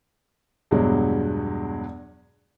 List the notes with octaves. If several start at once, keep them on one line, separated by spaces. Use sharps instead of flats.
E2 G2 B2 F#3 G#3